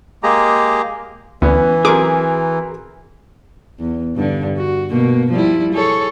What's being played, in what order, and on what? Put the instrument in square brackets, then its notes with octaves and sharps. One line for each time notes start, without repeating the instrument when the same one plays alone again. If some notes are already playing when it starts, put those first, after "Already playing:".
[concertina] G#3 A#3 G4 G#4 A#5
[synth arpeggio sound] D2 [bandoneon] E3 [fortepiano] B3 C#4
[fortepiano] F#3 C4 A#4 [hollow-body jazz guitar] G#4 [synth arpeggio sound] D6
[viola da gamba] E2
G2 D3
F#4
B2 A#3
F3 G3 E4
G#4 A4 C#5